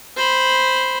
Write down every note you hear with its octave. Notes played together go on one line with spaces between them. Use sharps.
C5 B5